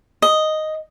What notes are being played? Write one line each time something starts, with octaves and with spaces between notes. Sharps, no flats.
D#5